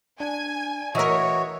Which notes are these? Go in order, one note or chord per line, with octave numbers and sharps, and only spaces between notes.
D4 G#5 G#6
E3 F#4 A#4 C#5 D#5 E5